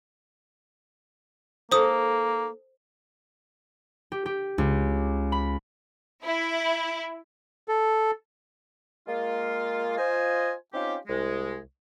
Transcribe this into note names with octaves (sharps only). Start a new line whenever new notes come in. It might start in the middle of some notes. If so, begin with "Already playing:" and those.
A#3 D#4 A4 C5 D#6
G4
G4
C#2
B5
E4
A4
G#3 A#3 F4
F4 C5 D#5 G#5
C4 C#4 D#4 F4 G4
C2 G#3